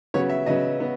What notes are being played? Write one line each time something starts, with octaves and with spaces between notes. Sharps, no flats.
C#3 F#3 B3 C#5
E5
C#3 F#3 B3 D#5
B3